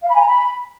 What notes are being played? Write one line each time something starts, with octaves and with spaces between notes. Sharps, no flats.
F5
B5
G#5
A#5
B5